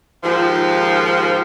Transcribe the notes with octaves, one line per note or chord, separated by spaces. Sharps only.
D#2 G#2 F3